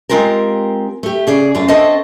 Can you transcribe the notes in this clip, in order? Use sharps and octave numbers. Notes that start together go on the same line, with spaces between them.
G#3 C4 F4 G4 A#4
A3 G4
C#3 G#4 D5
F#2 A3 F4 G#4
C4 D4 A4 C#5 D#5 E5